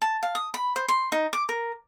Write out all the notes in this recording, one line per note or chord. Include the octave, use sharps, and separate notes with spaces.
A5
F5
D#6
B5
C5
C6
D#4
D6
A#4